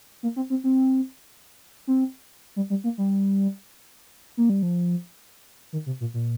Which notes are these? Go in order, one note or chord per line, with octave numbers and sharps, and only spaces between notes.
A#3
C4
C4
C4
C4
G3
G3
A#3
G3
A#3
G3
F3
D#3
C3
A#2
A#2